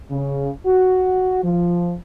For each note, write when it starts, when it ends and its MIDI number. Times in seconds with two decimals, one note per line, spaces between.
0.11 0.49 49
0.67 1.42 66
1.43 1.95 53